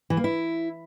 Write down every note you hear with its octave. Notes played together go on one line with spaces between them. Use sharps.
E3
A#3
E4